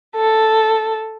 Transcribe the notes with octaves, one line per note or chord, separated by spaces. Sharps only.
A4